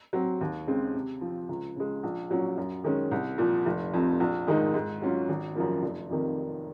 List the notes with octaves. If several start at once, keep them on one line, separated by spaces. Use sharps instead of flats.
F#3 C4
D#2
C#3 G#3 C4
C3
F3 C4
C#2
C#3 G#3
A#1
A#2 F#3 C#4
F#2
D#3 G#3 C#4
C2
A#2 F3
F1
F2 C3
A#1
G#2 D#3 G#3 D#4
G#2
F#3 C#4 F4
G#1
F#2 C#3 F3 A#3
F1
F2 C3 D#3 A#3